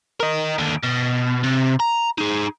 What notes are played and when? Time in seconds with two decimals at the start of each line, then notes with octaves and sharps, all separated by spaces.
0.20 A#4 D#5
0.59 D#2 D3
0.83 B2
1.43 C3
1.80 A#5
2.18 D#4 G#4